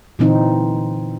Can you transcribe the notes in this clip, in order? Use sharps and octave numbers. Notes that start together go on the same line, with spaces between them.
A#2 D3 E3 C4 D#4